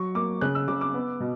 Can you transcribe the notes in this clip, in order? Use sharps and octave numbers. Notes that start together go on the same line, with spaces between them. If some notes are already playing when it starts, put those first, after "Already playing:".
Already playing: F#3 C#6
A#3 D6
C#3 F#6
E6
C#3 D6
D6
B3
B2